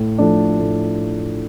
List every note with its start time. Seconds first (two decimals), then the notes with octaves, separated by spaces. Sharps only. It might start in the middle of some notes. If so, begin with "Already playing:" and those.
Already playing: A2
0.18 F3 A3 D4
0.59 A2